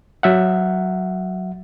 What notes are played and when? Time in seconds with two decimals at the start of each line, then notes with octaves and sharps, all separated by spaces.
0.23 F#3 E5 F#5